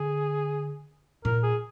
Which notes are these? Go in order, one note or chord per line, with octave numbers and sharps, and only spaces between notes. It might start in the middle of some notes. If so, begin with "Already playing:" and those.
Already playing: D3 G#4
A#2 A#4
G#4